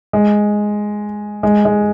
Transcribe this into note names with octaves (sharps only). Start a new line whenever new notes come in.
G#3
G#3
G#3